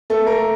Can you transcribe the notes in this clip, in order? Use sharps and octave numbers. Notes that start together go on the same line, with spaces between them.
A3 A4
A#3 A#4